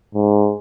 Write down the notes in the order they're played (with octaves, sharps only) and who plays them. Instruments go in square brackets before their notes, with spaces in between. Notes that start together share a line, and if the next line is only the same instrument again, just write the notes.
[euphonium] G#2